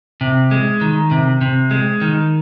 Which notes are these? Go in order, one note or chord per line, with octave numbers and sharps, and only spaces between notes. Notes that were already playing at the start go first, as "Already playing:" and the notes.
C3
G#3
D#3
C3
C3
G#3
D#3